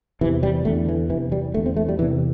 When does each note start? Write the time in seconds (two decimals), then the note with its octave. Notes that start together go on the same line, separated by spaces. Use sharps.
0.21 C3 E3
0.25 E2
0.43 G3
0.65 E2 D3 A3
0.89 E3
1.10 C3 E3
1.15 E2
1.32 G3
1.54 D3 A3
1.57 E2
1.66 C4
1.76 A3
1.89 G3
1.99 E2 C3 E3